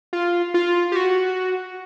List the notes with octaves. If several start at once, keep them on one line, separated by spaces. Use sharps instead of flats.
F4
F4
G4
F#4